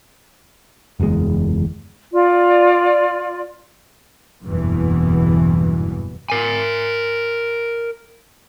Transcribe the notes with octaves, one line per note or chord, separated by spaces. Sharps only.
F#1 E2 G#2 G#3
F4 D5
F#1 E2 G2 B2 E3
A#4 G#5